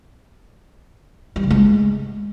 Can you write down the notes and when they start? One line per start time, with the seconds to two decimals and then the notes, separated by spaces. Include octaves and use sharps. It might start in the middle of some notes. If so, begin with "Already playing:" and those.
1.36 G3
1.43 C#3
1.50 G#3